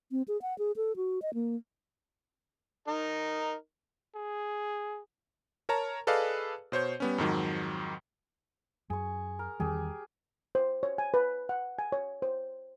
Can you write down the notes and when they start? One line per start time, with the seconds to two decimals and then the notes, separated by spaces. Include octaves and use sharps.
0.12 C4
0.28 G#4
0.42 F#5
0.58 G#4
0.76 A4
0.96 F#4
1.22 D#5
1.34 A#3
2.88 D#4 A#4
4.15 G#4
5.69 A#4 C#5 A5 A#5
6.07 G#4 A4 B4 D5 D#5 F5
6.72 B2 C5 C#5 G6
7.00 G3 B3 C#4
7.18 F2 G#2 D#3 F#3
8.90 F#2 G#4 C#6
9.39 A#4
9.60 E2 D#3 G3 G4 G#4
10.55 C5
10.83 C#5
10.98 G#5
11.14 B4
11.49 F#5
11.79 G#5
11.92 C#5
12.22 C5